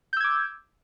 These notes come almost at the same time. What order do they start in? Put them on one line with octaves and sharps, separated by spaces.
G6 E6 G#6 D6